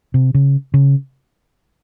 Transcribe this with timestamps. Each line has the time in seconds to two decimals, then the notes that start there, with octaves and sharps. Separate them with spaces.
0.14 C3
0.34 C#3
0.74 C#3